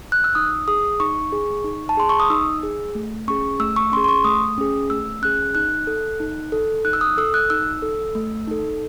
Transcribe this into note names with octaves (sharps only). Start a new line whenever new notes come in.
F#6
E6
D#4 D#6
G#4 D#6
D#4 C#6
G#4
D#4
A5
G#4 C6
C#6
D#6
D#4 E6
G#4
A3
C#4 G#4 C#6
A3 E6
C#6
C#4 G#4 C6
C6
C#6
A3 D#6
C#4 G#4
A3 E6
C#4 G#4 F#6
D#4 F#6
A4
D#4
A4
D#4 F#6
E6
D#6
A4 E6
F#6
D#4 E6
A4
A3
D#4 A4